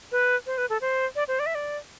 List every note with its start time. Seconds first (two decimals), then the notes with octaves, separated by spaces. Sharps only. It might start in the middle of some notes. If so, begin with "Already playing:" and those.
0.12 B4
0.46 C5
0.58 B4
0.70 A4
0.81 C5
1.16 D5
1.28 C5
1.39 D5
1.46 E5
1.55 D5